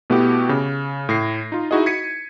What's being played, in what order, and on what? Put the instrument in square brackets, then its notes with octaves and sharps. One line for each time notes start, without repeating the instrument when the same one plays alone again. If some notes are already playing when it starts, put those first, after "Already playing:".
[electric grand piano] B2 A3 B3 E4 F#4 G4
C#3
A2 A#6 C7
D#4 F4
D#4 E4 F#4 G#4 D#5
G#6 B6 C#7 D#7